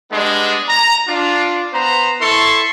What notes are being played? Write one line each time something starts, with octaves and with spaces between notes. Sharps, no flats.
G3 G#3 B3 D4
A#5
D4 F4
B3 C5 A#5
E4 A4 C6 C#6